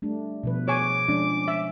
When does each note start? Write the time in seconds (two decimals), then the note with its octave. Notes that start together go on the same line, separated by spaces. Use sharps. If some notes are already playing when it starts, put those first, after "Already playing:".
0.02 G3 A3 D4
0.43 B2 F3 B4
0.68 G#4 C#5 G#5 D6
1.08 F3 G#3 C#4 D4
1.48 E5